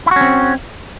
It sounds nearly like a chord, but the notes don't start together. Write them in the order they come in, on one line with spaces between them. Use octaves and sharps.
E4 F#4 C#4 C4